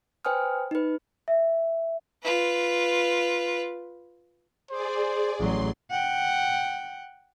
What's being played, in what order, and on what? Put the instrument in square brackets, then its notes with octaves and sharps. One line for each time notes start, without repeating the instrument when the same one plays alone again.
[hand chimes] B4 C5 G5 G#5 D#6 F6
D#4 B4
[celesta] E5
[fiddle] F4 B4
[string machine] G#4 D5 [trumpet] C5
[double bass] A1 F#3 [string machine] C6
[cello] F#5 G5